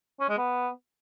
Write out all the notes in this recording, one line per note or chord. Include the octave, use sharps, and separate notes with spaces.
C#4
G#3
B3